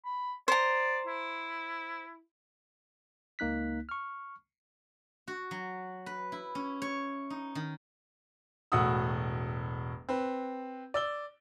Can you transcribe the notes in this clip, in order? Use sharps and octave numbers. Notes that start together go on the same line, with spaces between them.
B5
C5 D5 A#5
E4
C#2 A#3 D#4 F#6 B6
C#6 F6
F#4
F#3
B4
E4
C#4
C#5
D#4
D#3
E1 A2 F#4 F#5 D#6 E6
C4 B4
D5 E6 G7